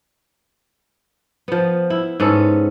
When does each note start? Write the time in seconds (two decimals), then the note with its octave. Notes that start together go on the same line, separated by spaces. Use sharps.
1.48 F3 B3
1.90 E4
2.20 G#2 B3 C#4 A4